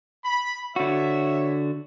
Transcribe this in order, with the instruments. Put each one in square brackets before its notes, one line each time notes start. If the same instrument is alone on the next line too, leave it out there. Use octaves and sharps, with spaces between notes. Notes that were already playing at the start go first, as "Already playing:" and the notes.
[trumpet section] B5
[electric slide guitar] D3 F#4 [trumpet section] C#5 E5